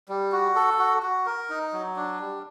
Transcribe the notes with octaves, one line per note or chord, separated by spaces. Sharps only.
G3
F#4
A4
F#4
F#4
A#4
D#4
F#3
D4
G3